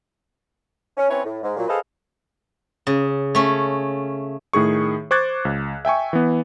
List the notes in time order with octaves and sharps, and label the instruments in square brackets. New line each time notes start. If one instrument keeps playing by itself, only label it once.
[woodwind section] C#4
C4 C#4 E4 B4 C#5
A2
G#2
A#2 F#3
G#4 A4 B4 C5 D#5 F5
[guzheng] C#3
A3 C#4
[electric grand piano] A2 D#3 G#4 C#6
C5 C#6 D6 F#6 G#6 A6
C#2
E5 G5 G#5 C#6
E3 B3